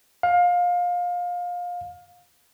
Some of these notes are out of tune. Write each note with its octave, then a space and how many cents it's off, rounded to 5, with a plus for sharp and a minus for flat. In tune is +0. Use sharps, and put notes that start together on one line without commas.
F5 +25